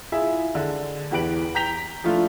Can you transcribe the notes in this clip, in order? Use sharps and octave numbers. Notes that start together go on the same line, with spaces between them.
E4 F4 G#4 E5
D3 G#3
E2 E3 G4 B4 D7 F#7
G5 A#5 G6 B6 F7
F3 A3 D4 E4 F4